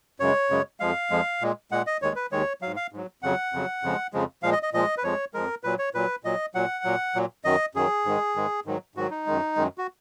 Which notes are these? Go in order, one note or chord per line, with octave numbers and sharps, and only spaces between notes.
F#2 C#3 G#3 C#5
F#2 C#3 G#3
F2 F3 G#3 F5
F2 F3 G#3
A#2 G#3
A#2 G#3 F#5
D#5
D#2 D#3 G#3 C#5
B4
D#2 D#3 G#3 C#5
G#2 F#3 F5
F5
G#2 F#3
F2 C#3 F#3 F#5
F2 C#3 F#3
F2 C#3 F3 G#3
F2 C#3 F3 G#3
A#2 F3 G#3 F5
D#5
D#5
A#2 F3 G#3 D#5
B4
F2 F3 G#3 C#5
F2 F3 G#3 A#4
A#2 F#3 B4
C#5
A#2 F#3 B4
A#2 F#3 D#5
A#2 F#3 F#5
A#2 F#3
A#2 F#3
F#2 D#3 F#3 D#5
F#2 D#3 F#3 G#4
G#2 D#3 G#3
G#2 D#3 G#3
G#2 D#3 F#3
G#2 D#3 F#3 F#4
D#4
F#2 D#3 G#3
F#2 D#3 G#3
F#4